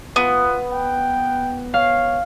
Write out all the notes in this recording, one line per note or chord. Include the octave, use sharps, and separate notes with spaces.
B3 F4
G5
C#5 F5